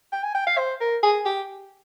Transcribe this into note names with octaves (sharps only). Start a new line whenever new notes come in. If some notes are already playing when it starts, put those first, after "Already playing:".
G5
G#5
G5
F5
C5
A#4
G#4
G4